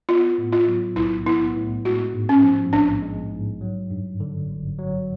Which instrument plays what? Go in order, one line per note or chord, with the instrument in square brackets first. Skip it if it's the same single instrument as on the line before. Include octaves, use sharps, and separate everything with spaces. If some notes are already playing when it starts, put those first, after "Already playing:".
[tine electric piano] B3 [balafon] F4
[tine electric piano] A2
[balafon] F4
[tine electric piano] F#3
[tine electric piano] B1 [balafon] E4
[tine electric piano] B3 [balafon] E4
[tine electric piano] A2
[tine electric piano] G#3 [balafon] F#4
[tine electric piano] G#2
[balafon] C#4
[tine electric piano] F3
[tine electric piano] A#1 [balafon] D4
[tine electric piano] G#3
G#2
F#3
G2
D3
G1
F#3